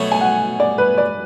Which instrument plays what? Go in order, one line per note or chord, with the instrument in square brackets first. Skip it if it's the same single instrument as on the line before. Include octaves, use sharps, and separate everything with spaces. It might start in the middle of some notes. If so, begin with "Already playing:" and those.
Already playing: [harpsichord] B2 F#3 A3 C#4
[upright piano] G#5
F#5
D5
B4
D5